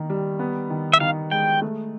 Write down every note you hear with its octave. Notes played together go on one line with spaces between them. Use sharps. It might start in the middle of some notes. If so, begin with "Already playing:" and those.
Already playing: D#3 A#3
G3
B3
D#3
E5
D#3 F5
G#3 G5
A3